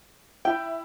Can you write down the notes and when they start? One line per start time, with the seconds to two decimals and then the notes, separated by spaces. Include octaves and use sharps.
0.45 E4 G5